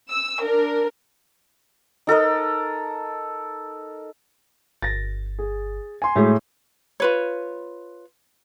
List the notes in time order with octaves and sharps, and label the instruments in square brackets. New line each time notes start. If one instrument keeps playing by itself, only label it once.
[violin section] E6
D4 A#4
[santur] D#4 A4 A#4 D#5
[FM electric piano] G1 [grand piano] A6 A#6
[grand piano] G#4
G#5 C6
[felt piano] A2 G#4 [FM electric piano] G#3 F#4
[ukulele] F4 B4 C#5